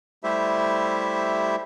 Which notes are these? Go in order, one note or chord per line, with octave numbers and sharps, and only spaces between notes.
G3 A3 E4 G4 C5 E5